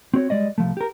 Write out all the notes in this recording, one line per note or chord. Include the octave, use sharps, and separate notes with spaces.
C4 F#4 C#5
G3 G#3 D5 D#5
C2 F3 A3
G4 A#4